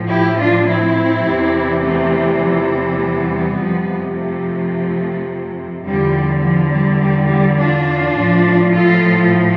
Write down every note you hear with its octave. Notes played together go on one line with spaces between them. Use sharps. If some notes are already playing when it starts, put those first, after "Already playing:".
Already playing: A2 F3
E4 G4
D4 F4
C4 E4
E2 C3 E3
A3 C4
F3 A3
G3 B3
F2 C3 F3
F3 A3
E2 D3 F3 G3
F3
G3
G3
G3
D4 F4
A2 F3
F4 A4